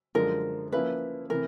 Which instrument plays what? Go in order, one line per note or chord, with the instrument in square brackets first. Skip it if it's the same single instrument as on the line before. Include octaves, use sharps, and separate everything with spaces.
[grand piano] F#2 D3 F3 G#3 C#4 [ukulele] A#4
[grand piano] F3 A#3 C#4 E4 [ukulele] B4
[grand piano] C3 E3 A3 [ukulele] A#4